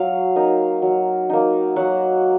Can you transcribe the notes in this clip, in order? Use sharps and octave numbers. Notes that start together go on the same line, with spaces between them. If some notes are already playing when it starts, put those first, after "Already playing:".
Already playing: F#3 F5
A#3 D#4
F#3
A#3 D#4
F#3 F#5